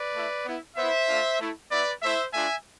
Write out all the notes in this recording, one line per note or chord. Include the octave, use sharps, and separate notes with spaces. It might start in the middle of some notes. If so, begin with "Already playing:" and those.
Already playing: B4 D5
A3 E4
B3 E4
B3 E4 C5 E5
A3 D4 F4
A3 E4
B3 E4 B4 D5
A3 E4 C5 E5
A3 D4 F4 E5 G#5